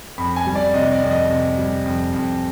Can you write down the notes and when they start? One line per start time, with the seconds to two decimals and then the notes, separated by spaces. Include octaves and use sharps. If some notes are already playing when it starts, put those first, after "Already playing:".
0.18 F2 B5
0.36 G#5
0.46 G3
0.55 D5
0.74 C3 D#5
0.92 D5
1.02 F2
1.11 D#5
1.30 C3
1.58 G3
1.86 F2
2.14 F2